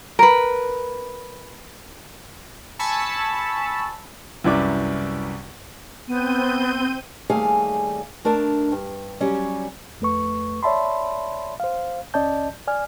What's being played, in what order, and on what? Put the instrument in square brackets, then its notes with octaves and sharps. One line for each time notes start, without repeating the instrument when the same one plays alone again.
[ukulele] A#4 B4
[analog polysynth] G#5 A5 B5 C#6 E6
[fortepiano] C2 F#2 E4 B4 D5 D6
[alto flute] B3 [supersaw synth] C4 G6 D#7
[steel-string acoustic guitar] D#2 G3 A3 G#4 F5 G#5
A3 D4 A#4 A5
G2
F#3 G3 C#4
[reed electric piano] F2 A3 B4 C#6
C#5 D5 E5 A5 B5 C6
C5 F5
C#2 C#4 D5 D#5 A5 G6
D5 G#5 F6